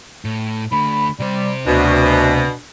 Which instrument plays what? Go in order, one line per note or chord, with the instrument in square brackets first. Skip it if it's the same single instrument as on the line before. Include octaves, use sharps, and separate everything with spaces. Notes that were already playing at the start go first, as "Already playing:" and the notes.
[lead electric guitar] A2
[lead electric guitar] D3 A3 [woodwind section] B5
[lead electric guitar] C3 C5 [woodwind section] G3
[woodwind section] D2 [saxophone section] B2 [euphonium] D4